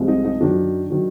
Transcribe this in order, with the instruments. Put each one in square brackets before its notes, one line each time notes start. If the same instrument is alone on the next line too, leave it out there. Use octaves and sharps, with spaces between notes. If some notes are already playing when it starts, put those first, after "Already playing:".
Already playing: [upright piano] C2 C3 F3 G#3
D#4
D#4
F#2 D#3 F#3 D4
D#3 F#3